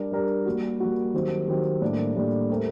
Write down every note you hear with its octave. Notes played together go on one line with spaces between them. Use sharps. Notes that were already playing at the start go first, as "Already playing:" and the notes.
Already playing: G3 D4 G4 A#4
G3 D4 G4 A#4
G3 A#3 F#4
G3 A#3 F#4
D#3 F#3 C4 G4
D#3 F#3 C4 G4
A2 G3 A#3 D4
A2 G3 A#3 D4
A3 C4 G4 A#4